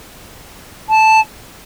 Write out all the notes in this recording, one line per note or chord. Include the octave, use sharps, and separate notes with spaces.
A5